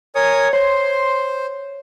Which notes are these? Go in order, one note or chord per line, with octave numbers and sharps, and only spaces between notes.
A#4 C#5 G#5 D#6
C5 C#5 C6